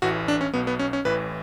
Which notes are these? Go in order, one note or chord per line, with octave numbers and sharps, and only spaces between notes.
A1 A2 E3 F#4
D4
C#4
B1 B2 B3
B3
C#4
C#4
A1 A2 E3 B4